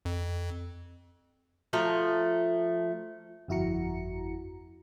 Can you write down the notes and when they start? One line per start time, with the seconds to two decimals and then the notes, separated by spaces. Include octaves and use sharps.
0.05 F2
1.73 F3 A3 A#5
3.48 G1 F2 E4 F#4 A#5 C#7